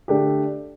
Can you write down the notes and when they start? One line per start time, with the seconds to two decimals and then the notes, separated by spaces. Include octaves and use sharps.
0.08 D3 A3 D4 G4